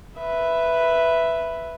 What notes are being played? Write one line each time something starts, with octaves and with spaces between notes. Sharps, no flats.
B4 E5